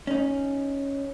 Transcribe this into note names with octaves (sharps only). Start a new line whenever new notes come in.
C#4 D#4